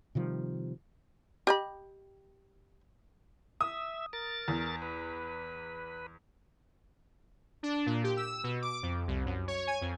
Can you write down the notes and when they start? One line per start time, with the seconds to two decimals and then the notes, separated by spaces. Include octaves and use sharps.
0.15 C3 D#3 F3 G3
1.47 G4 D#5 B5
3.61 E5 D#6
4.13 A#4 A6
4.48 E2
4.82 B4
7.63 D4
7.86 A#2
8.04 G4
8.17 E6
8.44 B2
8.62 D6
8.83 F2
9.08 C2
9.26 F#2
9.48 C#5
9.67 G#5
9.81 F2